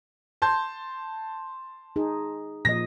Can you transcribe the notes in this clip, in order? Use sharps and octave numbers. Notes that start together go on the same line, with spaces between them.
A5 C6 G6
D#4 G#4
A#2 F3 D#5 A#6